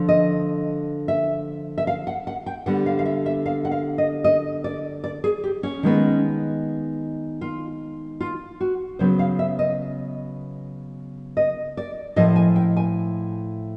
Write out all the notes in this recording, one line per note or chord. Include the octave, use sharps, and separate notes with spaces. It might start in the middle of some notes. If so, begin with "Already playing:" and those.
Already playing: D3 F3
D#5
E5
E5
F5
F#5
F#5
G5
D3 G3 B3 F#5
F5
F5
E5
E5
F5
F#5
F5
D#5
D#5
D5
D5
G#4
G4
C#4
D#3 G#3 B3
F4
F4
F#4
C#3 F#3 B3 C5
F5
E5
D#5
D#5
D5
A2 F3 A3 D#5
G#5
G5
G#5